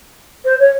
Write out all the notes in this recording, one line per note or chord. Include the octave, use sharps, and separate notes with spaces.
C5
C#5